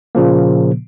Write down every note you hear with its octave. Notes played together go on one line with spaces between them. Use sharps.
A#2 C#3 F3 A#3